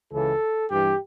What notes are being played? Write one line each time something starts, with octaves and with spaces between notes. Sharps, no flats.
C#2 C#3 E3 A4
G2 E3 G4